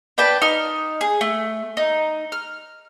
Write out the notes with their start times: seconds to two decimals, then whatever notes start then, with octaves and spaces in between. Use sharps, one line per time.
0.18 D4 B4 G5 A5
0.42 D#4 F6
1.01 G#4
1.21 A3
1.77 D#4
2.32 F6